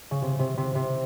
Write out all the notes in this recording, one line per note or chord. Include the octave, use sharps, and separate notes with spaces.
C#3
C3
C3
C3
C3